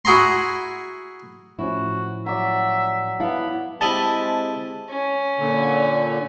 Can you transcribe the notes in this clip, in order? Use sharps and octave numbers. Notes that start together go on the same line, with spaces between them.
E4 F#4 G#4 A#5 C6
A2 F3 C#4 E4 F#4
F#3 D5 E5
B3 E4 F5 F#5 A5
G#3 C4 E4 G4 D#5 A5
C#4
A#2 D3